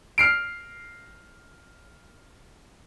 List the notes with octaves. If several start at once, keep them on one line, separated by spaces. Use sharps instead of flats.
F6 C7 D7